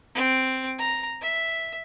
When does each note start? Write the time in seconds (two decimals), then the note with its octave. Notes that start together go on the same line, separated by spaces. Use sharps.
0.15 C4
0.78 A#5
1.22 E5